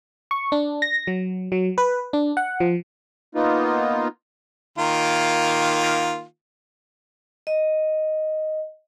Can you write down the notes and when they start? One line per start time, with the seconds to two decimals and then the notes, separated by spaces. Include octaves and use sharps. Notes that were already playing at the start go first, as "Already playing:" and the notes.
0.31 C#6
0.52 D4
0.82 A#6
1.07 F#3
1.52 F#3
1.78 B4
2.13 D4
2.37 F#5
2.60 F3
3.35 A#3 B3 D#4 F4
4.78 D#3 A#3 F4
7.47 D#5